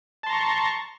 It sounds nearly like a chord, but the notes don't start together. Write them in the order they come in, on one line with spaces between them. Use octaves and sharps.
A5 C6 A#5 C#6